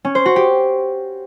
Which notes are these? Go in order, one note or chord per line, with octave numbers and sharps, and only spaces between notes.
C#4
C5
F#4
G4